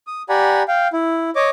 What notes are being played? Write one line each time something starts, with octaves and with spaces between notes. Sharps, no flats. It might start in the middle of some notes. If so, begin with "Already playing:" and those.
D#6
G4 D5 F#5 G#5 A#5 B5
F5 G5
E4
C#5 D#5 D6